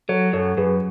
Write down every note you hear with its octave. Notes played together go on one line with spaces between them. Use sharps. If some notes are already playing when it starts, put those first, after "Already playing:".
F#3 A4 C#5
F#2 A4 C#5
F#2 G#4 B4